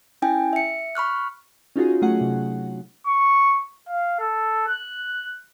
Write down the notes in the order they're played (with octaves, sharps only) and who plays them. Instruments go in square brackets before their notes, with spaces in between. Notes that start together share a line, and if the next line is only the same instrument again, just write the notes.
[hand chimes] C#4 E4 G5 G#5
E5 C#7
B5 C#6 F6 F#6
[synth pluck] C#4 D#4 F4 F#4 G#4
F#3 A3 C#4 G#4 F#5
C3
[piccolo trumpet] C#6
F5
A4
F#6